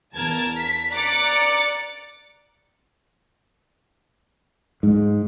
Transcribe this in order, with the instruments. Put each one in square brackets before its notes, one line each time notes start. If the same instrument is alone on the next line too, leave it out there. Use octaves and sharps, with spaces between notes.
[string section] E2 A#4 A5 G#6
B6
D5 A#5 D6 F#6 A6 C#7
[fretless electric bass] G#2